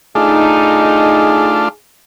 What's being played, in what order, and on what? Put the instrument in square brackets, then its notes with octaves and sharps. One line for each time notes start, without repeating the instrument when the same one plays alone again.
[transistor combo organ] A3 D4 F4 [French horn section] D#4 [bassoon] G#4